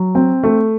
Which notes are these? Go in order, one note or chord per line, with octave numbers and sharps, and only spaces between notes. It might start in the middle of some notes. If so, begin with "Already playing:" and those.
Already playing: F#3
C4
A3